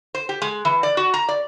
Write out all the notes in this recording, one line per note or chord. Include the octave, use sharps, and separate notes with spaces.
C5
G4
G#3
E3
D5
F#4
A#5
D5